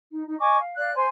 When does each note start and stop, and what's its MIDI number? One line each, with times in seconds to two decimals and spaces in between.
0.11 0.23 63
0.26 0.35 63
0.39 0.56 75
0.39 0.56 80
0.39 0.56 85
0.39 0.56 86
0.59 0.75 77
0.76 0.92 74
0.76 0.92 77
0.76 0.92 90
0.93 1.07 72
0.93 1.07 80
0.93 1.07 84